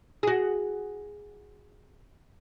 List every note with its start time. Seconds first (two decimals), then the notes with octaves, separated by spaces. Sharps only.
0.23 F#4 G#4